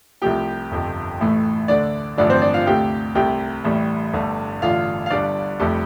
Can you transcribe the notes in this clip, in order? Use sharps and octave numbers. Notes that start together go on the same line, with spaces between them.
C2 C3 F3 A3 G4 G5
G1 F2 C3
A1 A2 A3
D2 D3 A3 D4 D5
A1 G2 D3 F3 A3 D4 D5
C4 C5
D4 D5
F4 F5
D2 C3 A3 G4 G5
C2 C3 A3 G4 G5
A1 A2 G3
G1 G2 D3 A3
A1 G2 D3 F4 F5
F5
G1 G2 G3 D4 D5
F1 F2 C3 G3 A3 A4